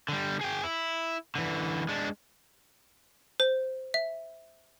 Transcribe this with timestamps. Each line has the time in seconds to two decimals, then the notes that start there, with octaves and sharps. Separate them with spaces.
0.09 D3 G3
0.41 G#4 G5
0.64 E4
1.35 D3 E3
1.89 G#3 D4
3.40 C5
3.94 E5